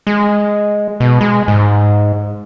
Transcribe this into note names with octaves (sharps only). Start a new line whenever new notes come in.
G#3
B2
G#3
G#2